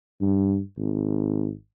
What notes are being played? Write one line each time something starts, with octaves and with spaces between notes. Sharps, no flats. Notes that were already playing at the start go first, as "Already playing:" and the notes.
G2
G#1